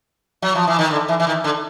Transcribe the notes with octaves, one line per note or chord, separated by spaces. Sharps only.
F#3
F3
E3
D#3
D3
E3
E3
D#3
D3